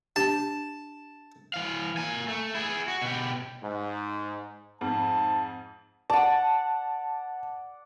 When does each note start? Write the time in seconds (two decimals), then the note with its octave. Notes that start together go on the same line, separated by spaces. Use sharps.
0.16 D4 G4 A5
1.54 E3 F5
1.97 A#3 G#5
2.28 A3
2.55 E4 G#4
2.88 F#4
3.02 B2 G4
3.62 G#2
4.81 F2 G#2 A5
6.10 D5 F#5 A5